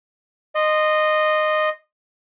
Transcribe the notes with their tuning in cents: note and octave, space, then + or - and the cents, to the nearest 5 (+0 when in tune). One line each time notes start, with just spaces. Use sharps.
D#5 -15 C6 +0